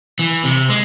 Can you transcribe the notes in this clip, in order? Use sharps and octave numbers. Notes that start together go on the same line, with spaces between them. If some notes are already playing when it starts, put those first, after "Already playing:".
E3
C3
G#3